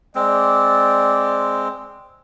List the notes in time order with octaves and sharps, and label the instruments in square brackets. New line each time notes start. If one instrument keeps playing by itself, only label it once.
[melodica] G#3 C4 [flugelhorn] D5